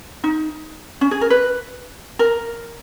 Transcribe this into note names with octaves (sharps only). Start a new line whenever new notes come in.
D#4
C#4
G#4
A#4
B4
A#4